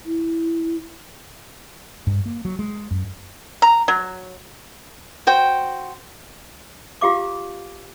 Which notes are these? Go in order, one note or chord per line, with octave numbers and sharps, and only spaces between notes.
E4
G2
A#3
F#3
G#3
F#2
A#5
F#3
F#4 C5 G5
F4 G4 F5 D6